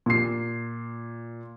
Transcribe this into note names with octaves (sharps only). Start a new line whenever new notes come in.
A#2 C7